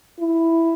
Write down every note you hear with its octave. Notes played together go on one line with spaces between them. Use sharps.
E4